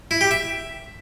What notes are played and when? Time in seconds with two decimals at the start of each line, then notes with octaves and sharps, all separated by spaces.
0.11 E4
0.21 G4
0.31 E5